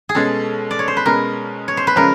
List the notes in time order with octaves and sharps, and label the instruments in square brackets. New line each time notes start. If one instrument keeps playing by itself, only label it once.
[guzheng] G#4
[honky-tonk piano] B2 G#3 C#4 [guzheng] A4
[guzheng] D5
C#5
C5
B4
[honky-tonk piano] B2 G#3 C#4 [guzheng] A#4
[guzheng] C#5
C5
B4
[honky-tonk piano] C#3 F3 G#3 C#4 [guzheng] A#4